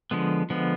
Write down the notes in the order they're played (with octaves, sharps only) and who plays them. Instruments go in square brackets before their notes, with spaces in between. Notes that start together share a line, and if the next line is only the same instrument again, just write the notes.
[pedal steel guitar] D3 F3 G#3 B3
D3 F3 G#3 B3